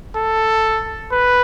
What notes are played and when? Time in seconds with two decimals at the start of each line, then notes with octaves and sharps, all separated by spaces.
0.16 A4
1.12 B4